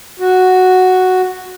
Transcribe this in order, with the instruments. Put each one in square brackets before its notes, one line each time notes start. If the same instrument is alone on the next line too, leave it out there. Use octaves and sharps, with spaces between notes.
[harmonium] F#4